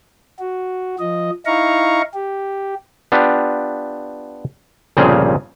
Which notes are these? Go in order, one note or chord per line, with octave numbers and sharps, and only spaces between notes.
F#4
F3 D#5
D#4 E4 F5 A#5 C#6
G4
B3 D4 F4 G4
G1 A#2 C#3 F3 C4 G#4